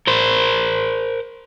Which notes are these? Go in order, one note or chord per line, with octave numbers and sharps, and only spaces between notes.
A#4 C5